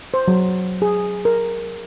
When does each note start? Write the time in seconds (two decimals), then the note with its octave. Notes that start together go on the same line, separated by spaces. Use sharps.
0.14 C5
0.28 F#3
0.82 G#4
1.25 A#4